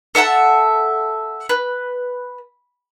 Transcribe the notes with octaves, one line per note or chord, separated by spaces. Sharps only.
A4 E5 F#5 A5
B4